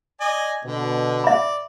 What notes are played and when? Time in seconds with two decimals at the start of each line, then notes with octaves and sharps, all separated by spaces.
0.21 D5 D#5 G#5
0.65 B2 D3
1.24 D5 E5 B5